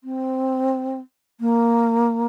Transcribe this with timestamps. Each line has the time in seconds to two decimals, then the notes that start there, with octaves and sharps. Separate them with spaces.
0.04 C4
1.40 A#3